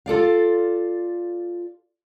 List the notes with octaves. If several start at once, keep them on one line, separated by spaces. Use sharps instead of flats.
F4 A4 D5 F5